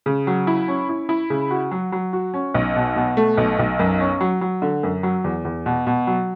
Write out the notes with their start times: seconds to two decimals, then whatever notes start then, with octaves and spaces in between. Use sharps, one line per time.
0.06 C#3
0.27 F#3
0.47 E4
0.68 C#4
0.89 E4
1.09 E4
1.30 C#3
1.51 F#4
1.71 F#3
1.92 F#3
2.13 F#4
2.34 C#4
2.54 B1
2.76 B2
2.96 B2
3.17 A3
3.37 B1
3.59 B1
3.79 F#2
4.00 C#4
4.21 F#3
4.41 F#3
4.62 D3
4.83 F#2
5.03 F#3
5.24 E2
5.45 E2
5.66 B2
5.87 B2
6.07 F#3